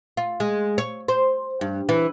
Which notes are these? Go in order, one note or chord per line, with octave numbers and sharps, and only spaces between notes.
F4
G#3
C#5
C5
G2
E3